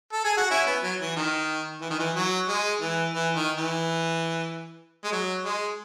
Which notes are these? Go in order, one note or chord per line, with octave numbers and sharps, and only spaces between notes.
A4
G#4
F#4
C#4 E4
B3
F#3
E3
D#3
E3
D#3
E3
F#3
G#3
E3
E3
D#3
E3
G#3
F#3
G#3